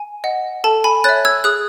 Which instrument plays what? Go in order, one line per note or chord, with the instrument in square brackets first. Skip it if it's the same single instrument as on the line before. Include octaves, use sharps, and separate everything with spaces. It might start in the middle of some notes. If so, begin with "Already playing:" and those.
Already playing: [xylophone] G#5
D#5 F#5
A4 A5
G#5 B5
C#5 E5 F#6 A6
E6 G#6
G#4 D#6 F#6